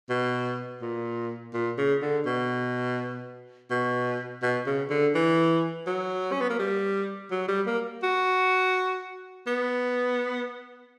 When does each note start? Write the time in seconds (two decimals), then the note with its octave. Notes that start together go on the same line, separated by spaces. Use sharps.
0.10 B2
0.82 A#2
1.54 A#2
1.78 C#3
2.02 D3
2.26 B2
3.71 B2
4.43 B2
4.67 C#3
4.90 D3
5.15 E3
5.87 F#3
6.32 C#4
6.41 B3
6.50 A#3
6.59 G3
7.31 F#3
7.48 G3
7.67 A#3
8.03 F#4
9.47 B3